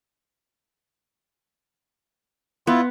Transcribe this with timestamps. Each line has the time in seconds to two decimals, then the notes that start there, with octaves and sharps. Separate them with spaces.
2.67 B3 E4 F4